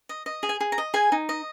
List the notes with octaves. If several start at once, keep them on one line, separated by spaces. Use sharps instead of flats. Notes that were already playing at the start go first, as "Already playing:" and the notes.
D#5
D#5
G#4
G#5
G#4
A#5
D#5
G#4 G#5
D#4
D#5